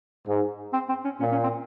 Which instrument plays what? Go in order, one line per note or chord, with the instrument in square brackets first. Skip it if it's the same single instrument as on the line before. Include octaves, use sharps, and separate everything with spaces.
[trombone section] G#2
[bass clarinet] C4
C4
C#4
[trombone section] A#2 [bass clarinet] C#4
[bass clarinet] C#4
C4